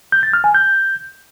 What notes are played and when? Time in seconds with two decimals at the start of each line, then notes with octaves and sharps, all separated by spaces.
0.12 G6
0.23 A6
0.33 F6
0.44 G#5
0.55 G6